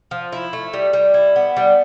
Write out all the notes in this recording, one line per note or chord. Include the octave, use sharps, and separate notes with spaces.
F3
E4
A3
G3
G3
E4
B3
G3